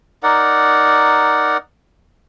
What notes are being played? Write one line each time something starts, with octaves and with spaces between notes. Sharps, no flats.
D#4 A#4 D5 F#5